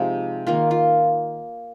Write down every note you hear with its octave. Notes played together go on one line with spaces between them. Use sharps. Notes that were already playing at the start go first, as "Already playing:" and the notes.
Already playing: C3 F3 G#3 D#4
D#3 A#3 F4
F4